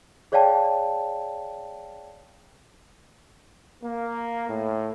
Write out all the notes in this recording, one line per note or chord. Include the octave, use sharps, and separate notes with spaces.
G#4 C#5 D5 F5 G5 A5
A#3
A2